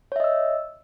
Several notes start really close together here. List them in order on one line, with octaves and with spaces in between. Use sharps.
C#5 E5 D#5 E6